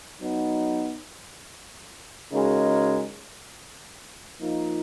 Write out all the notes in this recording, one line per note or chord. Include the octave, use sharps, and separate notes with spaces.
F#3 B3 D#4
C#3 G#3 D#4 F#4 A#4
F3 A#3 D#4